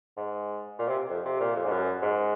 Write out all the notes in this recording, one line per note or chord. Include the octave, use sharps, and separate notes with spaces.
G#2
A#2
C3
F2
C3
A#2
F2
G#2
F#2
G#2